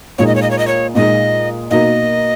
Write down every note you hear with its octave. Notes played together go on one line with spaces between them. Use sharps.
A#2 G#3 D#4 C#5
D#5
C#5
D#5
C#5
D#5
C#5
A#2 G#3 D#4 D#5
B2 A#3 D#4 F#4 A#4 D#5